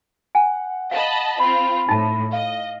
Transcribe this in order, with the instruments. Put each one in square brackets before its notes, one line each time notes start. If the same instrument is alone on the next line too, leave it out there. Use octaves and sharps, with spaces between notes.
[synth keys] F#5 [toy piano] G#5
[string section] D#5 A5 B5 [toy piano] F5
[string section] C4 F4 [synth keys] B5
[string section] A2 [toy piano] D#4 A5
[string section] D#5 [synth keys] F5